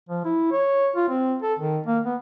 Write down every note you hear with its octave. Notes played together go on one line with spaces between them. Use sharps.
F3
E4
C#5
F4
C4
A4
D#3
A#3
B3